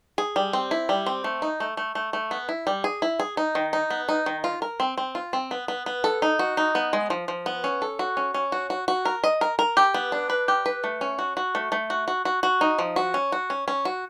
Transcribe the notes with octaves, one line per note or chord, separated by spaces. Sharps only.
G#4
G3
C4
E4
G3
C4
A3
D#4
A3
A3
A3
A3
B3
E4
G3
G#4
E4
G#4
D#4
D#3
D#4
B3
D#4
D#3
F4
A#4
C4
C4
F4
C4
B3
B3
B3
A4
D#4
F#4
D#4
B3
G#3
F3
F3
B3
C#4
A4
F#4
C#4
C#4
F#4
F#4
F#4
A#4
D#5
A#4
A#4
G4
B3
D4
B4
G4
B4
A3
C#4
F#4
F#4
A3
A3
F#4
F#4
F#4
F#4
D#4
F3
F#4
C#4
F#4
C#4
C#4
F#4